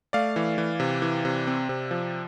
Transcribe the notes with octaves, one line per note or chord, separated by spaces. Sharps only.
A3 D5 F5
E3
E3
C3
E3
C3
C4
C3
F3